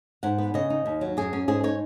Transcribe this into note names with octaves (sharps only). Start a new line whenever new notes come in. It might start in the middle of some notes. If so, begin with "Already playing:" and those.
G#2 F#5
B3
C#3 D#5
D#4
D#2
F#3
F#2 G#4
C#4
G#2 G#4
D#4 C#5